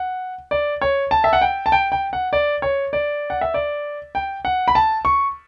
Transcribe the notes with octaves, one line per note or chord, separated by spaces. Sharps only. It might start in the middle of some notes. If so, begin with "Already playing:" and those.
Already playing: F#5
D5
C#5
A5
E5
F#5
G5
A5
G5
G5
F#5
D5
C#5
D5
F#5
E5
D5
G5
F#5
B5
A5
C#6